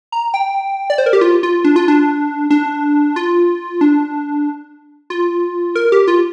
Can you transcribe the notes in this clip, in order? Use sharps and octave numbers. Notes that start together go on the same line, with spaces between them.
A#5
G5
D5
C5
A#4
G4
F4
F4
D4
F4
D4
D4
F4
D4
F4
A#4
G4
F4